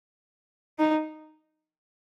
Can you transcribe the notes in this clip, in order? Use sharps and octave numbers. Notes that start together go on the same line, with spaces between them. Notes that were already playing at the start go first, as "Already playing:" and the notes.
D#4